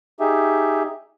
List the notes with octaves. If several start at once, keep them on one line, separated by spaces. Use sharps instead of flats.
D#4 G4 G#4 E5